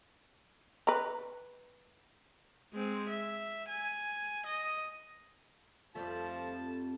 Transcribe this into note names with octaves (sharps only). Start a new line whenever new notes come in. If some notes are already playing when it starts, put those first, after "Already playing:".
B4 A#5
G#3 C4
E5
G#5
D#5
F2 F3 G3 A3 A5